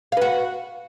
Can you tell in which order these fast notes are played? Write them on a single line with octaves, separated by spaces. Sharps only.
F5 B4 F#4